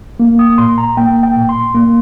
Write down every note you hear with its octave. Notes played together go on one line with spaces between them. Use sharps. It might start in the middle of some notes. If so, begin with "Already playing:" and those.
A#3
D#6
A#2 C6
A#5
A#3 G5
G5
A#2
C6
A#3